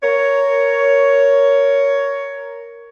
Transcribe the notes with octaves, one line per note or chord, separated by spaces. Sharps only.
A#4 C#5